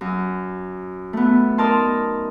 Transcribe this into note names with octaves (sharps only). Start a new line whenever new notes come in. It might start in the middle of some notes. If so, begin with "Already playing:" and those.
F#2
A3 B3
D#4 A#4 D5 A5 C6